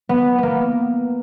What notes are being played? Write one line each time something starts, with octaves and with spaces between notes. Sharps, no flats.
B3
A#3 B3